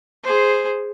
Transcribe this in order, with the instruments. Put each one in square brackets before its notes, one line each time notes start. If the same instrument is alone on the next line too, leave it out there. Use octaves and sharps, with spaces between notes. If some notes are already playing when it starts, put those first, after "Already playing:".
[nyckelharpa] G#4 C5